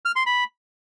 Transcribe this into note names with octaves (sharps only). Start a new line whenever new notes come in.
F6
C6
B5